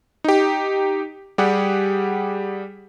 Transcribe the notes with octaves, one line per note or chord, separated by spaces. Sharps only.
D#4 G4
G3 G4 G#4 F#5